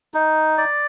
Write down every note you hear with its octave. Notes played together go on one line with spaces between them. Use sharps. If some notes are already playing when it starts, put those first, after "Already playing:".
D#4
D5